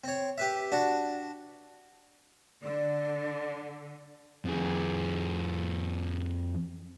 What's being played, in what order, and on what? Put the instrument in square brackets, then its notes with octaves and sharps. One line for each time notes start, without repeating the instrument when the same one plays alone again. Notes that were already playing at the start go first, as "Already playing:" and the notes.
[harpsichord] C4 C#5
G4 B4 E5
D4 F#4
[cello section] D3 [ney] D5
[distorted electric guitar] F2 G#4